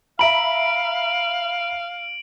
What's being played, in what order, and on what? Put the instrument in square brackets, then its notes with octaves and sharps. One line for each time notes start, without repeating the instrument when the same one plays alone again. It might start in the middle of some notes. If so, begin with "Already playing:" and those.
[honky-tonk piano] E5 A#5 B5 [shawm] F5 [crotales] D7 F#7